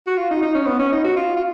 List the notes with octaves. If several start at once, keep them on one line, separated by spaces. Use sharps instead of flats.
F#4
F4
D#4
D#4
C#4
B3
C#4
D#4
F#4
F4
F4